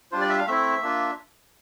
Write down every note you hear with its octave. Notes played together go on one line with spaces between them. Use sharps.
G3 D4 F4 C5
D5
E5
F5
A3 C4 E4 E5
A#3 D4 F4